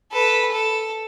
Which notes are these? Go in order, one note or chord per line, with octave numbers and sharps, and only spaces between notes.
A4 B4
A4